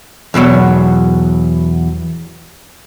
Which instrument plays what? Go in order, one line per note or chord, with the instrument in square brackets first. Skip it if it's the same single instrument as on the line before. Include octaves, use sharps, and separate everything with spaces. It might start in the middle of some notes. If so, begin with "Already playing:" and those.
[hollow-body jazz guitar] E2 B2 D3 F#3